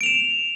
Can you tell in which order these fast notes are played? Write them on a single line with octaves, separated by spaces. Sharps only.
D7 F7 E7